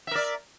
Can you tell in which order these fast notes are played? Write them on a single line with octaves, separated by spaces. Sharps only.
E5 A#4 D5